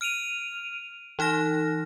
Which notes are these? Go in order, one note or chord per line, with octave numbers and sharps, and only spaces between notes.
F6 D7 D#7 F7
E3 D#4 F6 A#6